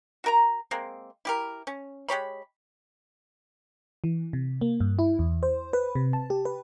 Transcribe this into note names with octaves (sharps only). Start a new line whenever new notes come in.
F#4 A#4 A#5
G#3 A#3 C4
E4 G4 A#4
C#4
G#3 G4 C#5 B5
E3
C3
A#3
G2
E4
E2
C5
B4
C3
A5
G4
B4